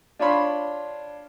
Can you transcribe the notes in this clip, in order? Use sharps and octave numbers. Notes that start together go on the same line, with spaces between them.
D4 F4 C#5 B5 C6